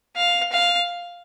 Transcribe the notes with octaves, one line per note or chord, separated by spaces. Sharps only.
F5
F5